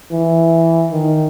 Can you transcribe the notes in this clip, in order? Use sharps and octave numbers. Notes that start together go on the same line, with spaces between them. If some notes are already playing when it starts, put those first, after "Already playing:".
E3
D#3